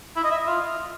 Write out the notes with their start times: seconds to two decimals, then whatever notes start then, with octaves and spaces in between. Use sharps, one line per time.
0.16 E4
0.24 D#5
0.31 E5
0.39 D#5
0.47 F4